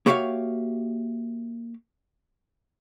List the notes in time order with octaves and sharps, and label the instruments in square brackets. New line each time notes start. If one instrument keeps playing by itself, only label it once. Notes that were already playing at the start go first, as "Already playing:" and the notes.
[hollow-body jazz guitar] A#3 F#4 G4 C#5 E5 F5